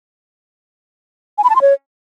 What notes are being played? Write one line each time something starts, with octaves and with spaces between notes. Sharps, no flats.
G#5
B5
A5
C6
C#5